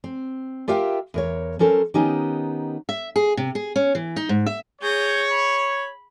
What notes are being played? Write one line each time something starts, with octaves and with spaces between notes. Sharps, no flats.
C4
F4 G4 A#4 E5 F5 G5
E2 A#4 C#5
F#3 C#4 A4 A#4 C5
D#3 B3 C#4 D#4 G4
E5
G#4
C3
G#4
C#4
E3
D#4
G#2
E5
G#4 C#5 G6 A#6
B5